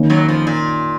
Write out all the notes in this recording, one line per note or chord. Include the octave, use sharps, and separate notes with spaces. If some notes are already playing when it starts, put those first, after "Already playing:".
Already playing: D#3 A#3 C#4
F#2 F#3
F2 F3
A#2